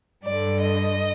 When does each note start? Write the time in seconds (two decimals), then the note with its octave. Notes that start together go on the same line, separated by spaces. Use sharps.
0.24 G2 D3 D5
0.61 D#5